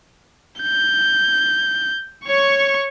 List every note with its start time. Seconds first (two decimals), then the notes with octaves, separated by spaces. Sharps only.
0.62 G6
2.26 C#5 C#6